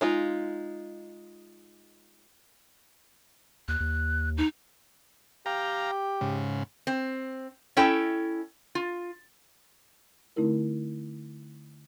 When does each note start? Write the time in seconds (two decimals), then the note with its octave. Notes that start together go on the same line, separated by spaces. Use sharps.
0.01 G#3 D#4 F4
3.68 D#2 F#6
3.80 D#2
4.37 D#4
5.46 G4 F5 G5 A#5
6.21 G#2 C#3
6.87 C4
7.77 C#4 E4 A4 C#5 G5 A5
8.75 F4
10.36 D3 A3 C4 D#4 E4 A#4